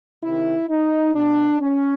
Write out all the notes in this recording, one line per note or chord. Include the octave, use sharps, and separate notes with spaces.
C3 D#3 E4
D#4
B2 D4
C#4